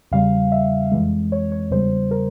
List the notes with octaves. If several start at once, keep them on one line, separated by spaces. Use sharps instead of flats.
E2 C#3 G3 F5
E5
F2 E3 G#3
C#5
C#5
E2 C#3 G3 C5
A#4